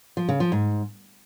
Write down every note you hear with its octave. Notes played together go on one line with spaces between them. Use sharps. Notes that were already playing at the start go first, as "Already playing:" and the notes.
F3
C#3
F3
G#2